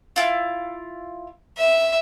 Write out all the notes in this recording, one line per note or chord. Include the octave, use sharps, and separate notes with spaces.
E4 F4
E5